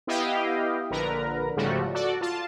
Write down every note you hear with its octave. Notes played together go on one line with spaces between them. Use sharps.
B3 E4 G4 D#5 F5 G5
A#1 D3 A#4 B4 A#5
G#2 C#3 F3 G3 A3 F#4
F#4 A4 D5
F4 A5